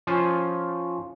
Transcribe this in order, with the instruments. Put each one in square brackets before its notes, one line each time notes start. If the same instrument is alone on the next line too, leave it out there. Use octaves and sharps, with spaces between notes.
[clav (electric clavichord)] F3 C#4 F4 C5 G#5